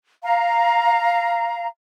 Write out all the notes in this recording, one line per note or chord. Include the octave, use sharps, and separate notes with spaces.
F5 A#5